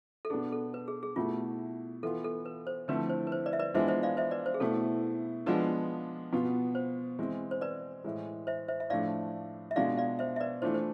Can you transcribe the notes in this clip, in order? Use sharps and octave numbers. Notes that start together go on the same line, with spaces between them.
A4
B2 B3 D4 G#4
A4
B4
G#4
G#4
B2 A3 E4 F4
E3 B3 F4 A4
A4
B4
C5
D3 F3 A3 C4 E4 B4
C5
B4
C5
B4 D5
E5
B4 D5
E3 G#3 B3 D4 F4 C5 E5
C5 E5
D5 F5
C5 E5
B4 D5
C5
G#4
B2 A3 E4 A4
F3 G#3 B3 D4 F4 B4
B2 B3 F4
C5
E3 G#3 C4
C5
B4 D5
A2 E3 G#3
C5 E5
C5 E5
E5
A2 F3 A3 D4 D5 F5
E5
B2 G#3 D4 F4 D5 F5
D5 F5
C5 E5
E5
B4 D5
E3 A3 D4 F4 C5
C5